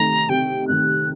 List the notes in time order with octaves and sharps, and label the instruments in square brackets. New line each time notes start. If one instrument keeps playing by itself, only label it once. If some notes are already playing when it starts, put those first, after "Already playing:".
Already playing: [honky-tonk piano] C3 D#3 A3 D#4 [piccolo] A#5
[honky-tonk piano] C3 [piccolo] G5
[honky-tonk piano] D#3 A3 D#4 [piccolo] F#6